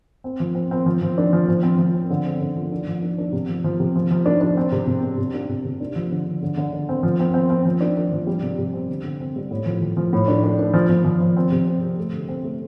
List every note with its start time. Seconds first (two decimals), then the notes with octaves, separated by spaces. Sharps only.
0.24 C4
0.40 F3
0.55 C4
0.71 C4
0.86 F3
1.02 F3
1.18 D4
1.33 F3
1.48 F3
1.63 C4
1.79 F3
1.94 C4
2.10 D3
2.25 C4
2.41 D3
2.56 F3
2.72 D4
2.87 F3
3.02 D4
3.18 D4
3.33 C3
3.48 F3
3.64 F3
3.80 C3
3.96 F3
4.11 F3
4.26 D4
4.41 D4
4.57 C4
4.72 C3
4.87 C3
5.03 C3
5.18 C3
5.34 D4
5.49 C3
5.65 C3
5.80 D4
5.96 F3
6.12 D3
6.26 D3
6.43 D3
6.57 D3
6.73 D3
6.89 C4
7.03 F3
7.20 C4
7.34 C4
7.50 C4
7.65 F3
7.81 D4
7.97 D4
8.12 F3
8.27 G3
8.43 C3
8.59 C3
8.73 C4
8.89 D3
9.04 D3
9.20 C4
9.36 G3
9.51 A2
9.66 F3
9.82 F3
9.97 F3
10.13 A2
10.28 D4
10.44 D4
10.59 D4
10.74 F3
10.89 F3
11.04 F3
11.21 F3
11.37 C4
11.52 C3
11.67 C4
11.82 C3
11.98 A3
12.13 D3
12.28 C4
12.44 A3